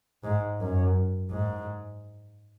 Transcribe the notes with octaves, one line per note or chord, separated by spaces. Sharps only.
G#2
F#2
G#2